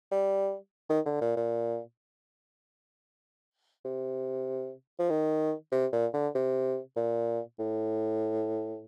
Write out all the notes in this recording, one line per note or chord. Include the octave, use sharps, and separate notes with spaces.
G3
D#3
D3
A#2
A#2
C3
F3
D#3
C3
A#2
D3
C3
A#2
A2